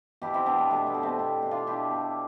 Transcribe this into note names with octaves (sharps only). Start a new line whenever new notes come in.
B2 E4 G4
C4 E4
B2 B3 D4
B3
B2 A3
B3
B2
A3 C4
B2
B2
D4 F4
B2 E4 G4
B2